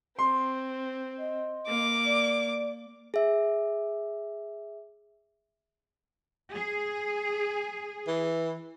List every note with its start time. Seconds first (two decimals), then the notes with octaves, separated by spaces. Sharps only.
0.19 C4 C6
1.19 D#5
1.68 A#3 D6
2.06 D5
3.14 G#4 E5
6.53 G#4
8.08 E3